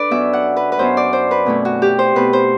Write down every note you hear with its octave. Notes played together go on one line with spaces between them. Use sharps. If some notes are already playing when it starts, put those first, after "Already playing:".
Already playing: D4 A4 B4 D5
F#2 F#3 B3 E5
F#5
B4
B4
F#2 F#3 B3 C5
D5
C5
B4
B2 A3 C4 E4
F#4
G4
C5
B2 A3 C4 B4
C5